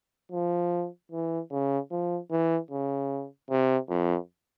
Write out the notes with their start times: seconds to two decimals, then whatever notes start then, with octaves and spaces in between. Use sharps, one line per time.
0.32 F3
1.12 E3
1.51 C#3
1.91 F3
2.30 E3
2.71 C#3
3.50 C3
3.89 F2